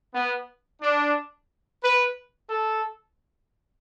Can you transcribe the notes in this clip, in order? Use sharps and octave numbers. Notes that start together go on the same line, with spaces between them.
B3
D4
B4
A4